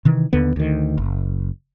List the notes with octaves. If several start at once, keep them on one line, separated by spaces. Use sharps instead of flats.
C3 D#3 E3
D#2 D3 B3
D2 D#3
F#1